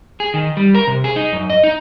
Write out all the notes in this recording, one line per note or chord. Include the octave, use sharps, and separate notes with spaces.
G#4
D#3
G3
A#4
C3
G#4
D#4
F#2
D#5
D#4